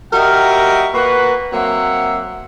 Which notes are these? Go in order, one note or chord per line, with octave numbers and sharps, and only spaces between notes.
G3 F#4 A#4 D#5 E5 G5
A#3 F#4 B4
F#3 A#3 C4 E5 F#5